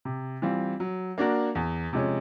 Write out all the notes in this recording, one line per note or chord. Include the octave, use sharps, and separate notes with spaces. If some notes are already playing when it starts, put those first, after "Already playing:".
C3
E3 G3 C4 F4
F#3
A#3 D4 F#4 A#4
E2
C3 F3 G#3 C#4